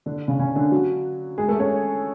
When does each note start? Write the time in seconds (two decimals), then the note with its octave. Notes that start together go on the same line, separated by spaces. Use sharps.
0.06 D3 D4
0.28 C#3 C#4
0.39 C#3 C#4
0.55 D3 D4
0.72 F#3 F#4
1.38 G#3 G#4
1.49 A3 A4
1.59 C#4 C#5